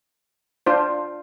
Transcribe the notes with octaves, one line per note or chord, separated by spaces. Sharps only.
D4 F4 C5